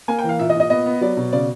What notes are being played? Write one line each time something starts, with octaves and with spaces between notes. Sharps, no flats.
A#3 G#5
G5
E3
F5
A#2 E5
D#5
A#2
D#5
B3 D#5
B3
F#3 D5
B2
C#3 D5